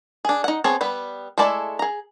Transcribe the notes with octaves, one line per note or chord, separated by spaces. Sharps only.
D4 G#4
D#4 F#5
B3 C4 G#4 C#5 A5
G3 B3 B4
G#3 A3 E4 A4 D5
G#4 A#5